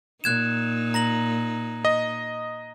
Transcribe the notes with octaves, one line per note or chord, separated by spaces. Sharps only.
A#2 D#4 F#6 G#6 E7
A#5 A#6 F#7
D#5